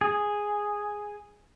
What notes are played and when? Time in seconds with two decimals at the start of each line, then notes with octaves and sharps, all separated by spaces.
0.01 G#4